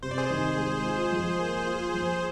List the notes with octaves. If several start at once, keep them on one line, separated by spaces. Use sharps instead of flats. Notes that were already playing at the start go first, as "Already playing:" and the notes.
C3 C5
D5
G#4 C5
D#3
G#3
F4
F3
A#3
F4
F3